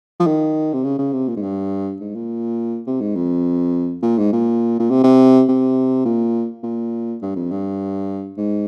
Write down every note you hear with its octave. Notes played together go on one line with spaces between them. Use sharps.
F3
D#3
C3
C#3
C#3
C3
A#2
G#2
G2
G#2
A#2
C3
G#2
F2
A#2
G#2
A#2
A#2
C3
C3
C3
A#2
A#2
G2
F2
G2
G#2